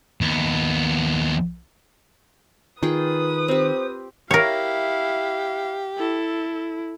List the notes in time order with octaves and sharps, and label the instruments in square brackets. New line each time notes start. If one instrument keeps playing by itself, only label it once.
[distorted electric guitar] D#2 B3
[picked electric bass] D#3 [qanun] F4 G#4 G5 [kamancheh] B4 D#6
[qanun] C4 G4 [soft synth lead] C5
[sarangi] E4 [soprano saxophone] G4 [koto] A#4 C#5 [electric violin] F5
[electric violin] E4 [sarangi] A4